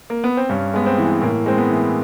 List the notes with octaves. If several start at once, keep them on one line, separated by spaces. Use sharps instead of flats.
A#3
B3
C4
G2 C#4
G#3 B3
C4
E3
A2 A#3
G#3 C4
B3
E3